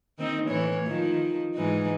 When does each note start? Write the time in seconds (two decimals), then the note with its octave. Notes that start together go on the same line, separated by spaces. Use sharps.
0.19 D#3 C4 D#4
0.49 A2 E3 C#5
0.88 D#3 F3
1.55 G#2 E3 D#4